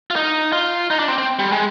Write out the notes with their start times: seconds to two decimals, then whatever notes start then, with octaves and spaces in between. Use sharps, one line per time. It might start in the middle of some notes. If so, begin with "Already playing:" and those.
0.11 F4
0.16 D#4
0.53 F4
0.90 D#4
0.99 D4
1.08 C4
1.18 C4
1.39 G3
1.52 G#3